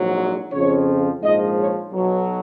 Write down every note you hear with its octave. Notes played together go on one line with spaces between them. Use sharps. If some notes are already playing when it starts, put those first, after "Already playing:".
Already playing: A#1 G#2 F#3
F2 C#3 F3 C#5
A#1 G#2 F3 D#5
C#5
B1 B2 F#3